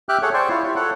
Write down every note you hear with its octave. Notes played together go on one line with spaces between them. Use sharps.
G4 E5 G5 D6 F6 F#6
G#4 A4 C#5 F#5
C5 D5 G5 C6 C#6
E4 F4 C#5
G4
A4 C#5 F#5